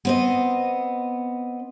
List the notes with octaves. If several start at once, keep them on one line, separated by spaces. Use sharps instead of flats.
B3 C4 D#5